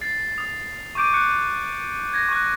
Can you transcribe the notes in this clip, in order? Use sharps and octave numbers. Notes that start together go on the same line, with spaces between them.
A6 C7
D#6
C#6 D6 G6 D7 D#7
C#6 F#6 C#7
G#6 A#6
C#6 F#6